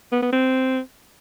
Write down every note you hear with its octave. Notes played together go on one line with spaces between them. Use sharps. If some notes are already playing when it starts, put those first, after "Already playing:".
B3
B3
C4